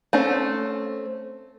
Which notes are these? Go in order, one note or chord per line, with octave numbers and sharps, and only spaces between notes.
A3 C4 C#4